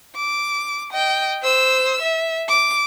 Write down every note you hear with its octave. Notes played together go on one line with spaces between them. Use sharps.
D6
D#5 G5
C5 E6
E5
D6